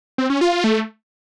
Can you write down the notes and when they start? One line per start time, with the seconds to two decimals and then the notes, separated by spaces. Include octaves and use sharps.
0.18 C4
0.30 C#4
0.41 F4
0.53 F4
0.64 A3